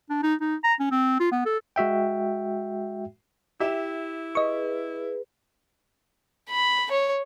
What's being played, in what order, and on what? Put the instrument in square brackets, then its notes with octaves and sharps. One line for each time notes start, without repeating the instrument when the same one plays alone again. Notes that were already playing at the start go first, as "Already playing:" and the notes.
[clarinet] D4
D#4
D#4
A#5
C#4
C4
F4
B3
A4
[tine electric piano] G#3 F#4 E5 G5
[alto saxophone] E4 [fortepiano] G4 E5
[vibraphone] G#4 B4 [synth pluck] D#5 C#6
[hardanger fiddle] B5
C#5